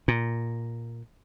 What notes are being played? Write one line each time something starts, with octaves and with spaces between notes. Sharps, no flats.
A#2